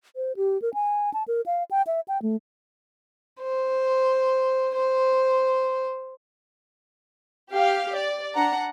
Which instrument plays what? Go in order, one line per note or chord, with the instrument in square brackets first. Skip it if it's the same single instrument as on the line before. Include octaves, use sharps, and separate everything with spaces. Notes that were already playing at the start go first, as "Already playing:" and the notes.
[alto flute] C5
G4
A#4
G#5
A5
A#4
F5
G5
E5
G5
A3
[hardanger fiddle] C5
C5
[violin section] G4 F5
D5
D4 F#5 A#5